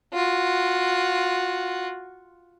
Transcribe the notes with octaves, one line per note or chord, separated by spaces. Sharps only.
F4 F#4